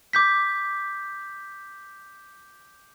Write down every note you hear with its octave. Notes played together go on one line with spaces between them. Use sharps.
D6 G6 B6